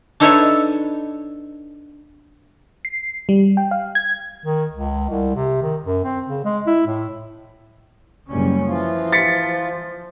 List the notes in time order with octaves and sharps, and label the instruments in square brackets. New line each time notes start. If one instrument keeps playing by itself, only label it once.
[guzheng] D4 D#4 A4 B4 C#5 E5
[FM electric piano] C7
G3
G5
F5
G#6
[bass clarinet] D#3
C#2
C2
C3
D#3
F#2
C4
C#3
G#3
E4
A2
[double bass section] F#1 G3 C#4
[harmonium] E3 F4 [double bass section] F3
[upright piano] A6 B6 C#7